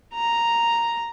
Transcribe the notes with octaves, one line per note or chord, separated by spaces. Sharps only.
A#5